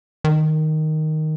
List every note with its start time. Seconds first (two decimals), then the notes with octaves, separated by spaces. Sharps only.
0.24 D#3